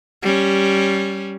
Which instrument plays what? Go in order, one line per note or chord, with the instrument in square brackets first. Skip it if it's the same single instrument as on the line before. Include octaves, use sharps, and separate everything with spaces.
[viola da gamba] G3 C#4